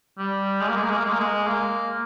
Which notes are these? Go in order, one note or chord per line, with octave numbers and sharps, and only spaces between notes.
G3
G#3
A#3
G#3
A#3
G#3
A#3
G#3
A#3
G#3
A#3